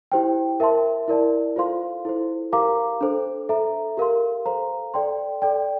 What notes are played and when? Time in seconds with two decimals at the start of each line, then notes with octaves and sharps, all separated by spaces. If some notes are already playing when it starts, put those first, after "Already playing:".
0.12 E4 G4 C5 G5
0.60 A#4 E5 A5 C6
1.08 E4 A#4 D5 A5
1.56 F4 A4 C5 F5 C6
2.05 E4 A4 C5
2.52 G4 A#4 F5 A#5 D6
3.01 D4 A4 C5
3.49 A4 E5 A#5
3.97 G4 A#4 F5 C6
4.46 A4 C5 F5 A#5
4.94 A4 D5 G5 C6
5.42 A4 D5 G5